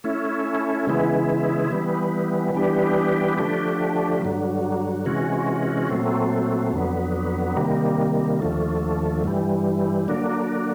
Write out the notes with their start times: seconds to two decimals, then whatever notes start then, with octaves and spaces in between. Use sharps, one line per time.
0.04 A3 C#4 E4
0.87 C#3 E3 G#3 B3 E4
1.71 E3 G3 B3
2.55 E3 G3 B3 D4 G4
3.38 D3 F3 A3 D4 G4
4.22 G2 D3 F#3
5.05 C3 E3 G#3 C#4 F#4
5.89 A#2 F#3 A3 C4
6.73 F2 D3 F#3 B3
7.56 C3 D#3 G3 A#3
8.40 D#2 D3 F3 A3
9.24 G2 E3 G3
10.08 D3 F#3 A#3 D4